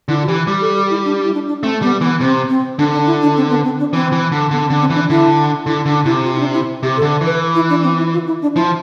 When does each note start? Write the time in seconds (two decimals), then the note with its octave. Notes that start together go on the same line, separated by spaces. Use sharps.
0.08 D3 E4
0.23 F4
0.27 E3 G4
0.47 G3 G4
0.61 A4
0.76 G4
0.90 E4
1.05 D4
1.23 E4
1.34 D4
1.48 D4
1.63 A3 C4
1.82 G3 B3
2.01 E3 B3
2.21 C3 C4
2.49 C4
2.79 D3 D4
2.93 D4
3.07 E4
3.22 D4
3.37 C4
3.50 B3
3.65 C4
3.79 D4
3.93 E3 C4
4.12 E3
4.32 D3
4.51 D3 B3
4.67 C4
4.70 D3
4.81 C4
4.90 E3 D4
5.09 D3 E4
5.66 D3 E4
5.86 D3 D4
6.05 C3 E4
6.25 F4
6.35 E4
6.40 D4
6.54 E4
6.83 C3 G4
6.97 A4
7.02 D3
7.21 E3 B4
7.55 E4
7.70 D4
7.83 C4
7.98 E4
8.13 F4
8.27 E4
8.42 D4
8.56 F3 E4